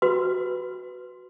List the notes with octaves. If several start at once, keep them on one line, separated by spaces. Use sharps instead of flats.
F#4 B4 C6